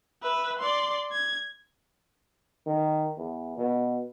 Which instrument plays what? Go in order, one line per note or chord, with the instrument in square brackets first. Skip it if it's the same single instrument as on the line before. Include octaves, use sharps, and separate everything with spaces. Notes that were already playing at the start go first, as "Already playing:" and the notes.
[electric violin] B4 E5
D5 C6
G#6
[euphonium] D#3
E2
B2